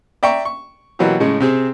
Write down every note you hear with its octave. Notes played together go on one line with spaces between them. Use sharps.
D5 E5 G5 A#5 C#6
C#6
B2 E3 F#3 A#3 F#4 G4
A2 C#3 G#3
C3 C4 G#4